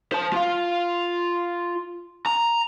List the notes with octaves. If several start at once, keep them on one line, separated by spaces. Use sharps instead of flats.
C5 A5
F4 F5
A#5